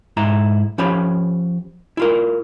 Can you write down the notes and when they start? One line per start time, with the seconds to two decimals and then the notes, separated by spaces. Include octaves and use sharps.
0.17 G#2 E4 A#5
0.78 F3 C#4 G4 C#5 B5
1.97 E4 F4 A#4